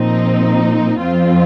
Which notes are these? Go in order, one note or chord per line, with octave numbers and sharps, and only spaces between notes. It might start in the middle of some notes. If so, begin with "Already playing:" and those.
Already playing: A#2 F3 C4 D#4
F2 F3 C4 F4